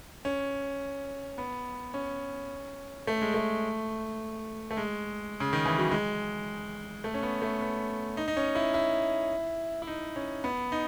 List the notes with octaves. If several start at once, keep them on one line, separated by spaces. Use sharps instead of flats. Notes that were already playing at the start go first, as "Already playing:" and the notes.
C#4
B3
C#4
A3
G#3
A3
A3
G#3
C#3
D#3
E3
F#3
G#3
A3
C#4
B3
A3
B3
D#4
D#4
C#4
E4
E4
E4
D#4
C#4
B3
D#4